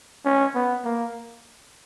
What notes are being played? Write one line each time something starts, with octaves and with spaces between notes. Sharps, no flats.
C#4
B3
A#3